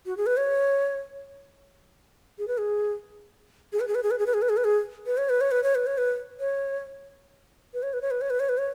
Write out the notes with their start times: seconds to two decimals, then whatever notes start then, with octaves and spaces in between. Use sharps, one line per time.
0.06 F#4
0.17 G#4
0.26 B4
0.37 C#5
2.39 G#4
2.48 B4
2.58 G#4
3.73 G#4
3.80 B4
3.88 G#4
3.95 B4
4.03 G#4
4.11 B4
4.19 G#4
4.26 B4
4.34 G#4
4.42 B4
4.49 G#4
4.57 B4
4.64 G#4
5.06 B4
5.17 C#5
5.29 B4
5.41 C#5
5.51 B4
5.64 C#5
5.75 B4
5.87 C#5
5.98 B4
6.40 C#5
7.74 B4
7.83 C#5
7.93 B4
8.02 C#5
8.11 B4
8.21 C#5
8.30 B4
8.40 C#5
8.49 B4
8.58 C#5